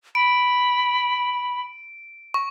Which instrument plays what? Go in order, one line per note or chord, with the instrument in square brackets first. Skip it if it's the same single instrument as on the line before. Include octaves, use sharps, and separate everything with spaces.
[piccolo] B5 [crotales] D7
[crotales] C#6